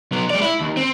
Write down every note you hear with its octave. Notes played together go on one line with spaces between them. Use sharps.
F#3 B3
G#3 D5
E4
D#2
C4